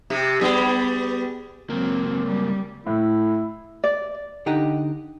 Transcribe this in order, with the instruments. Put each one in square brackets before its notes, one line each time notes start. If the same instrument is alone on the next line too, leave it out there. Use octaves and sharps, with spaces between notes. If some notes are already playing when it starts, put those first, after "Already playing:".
[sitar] C3 G4
G3 B3 G#4
[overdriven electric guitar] C#2 A#3 [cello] F#3 C4
[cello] G3
[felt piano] A2 [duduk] E4
[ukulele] D5
[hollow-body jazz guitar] D3 D#4 G4 D#5 F#5 A#5